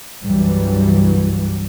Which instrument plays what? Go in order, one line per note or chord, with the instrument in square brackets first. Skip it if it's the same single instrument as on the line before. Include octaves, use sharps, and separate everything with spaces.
[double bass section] C2 G2 E3 F#3 G3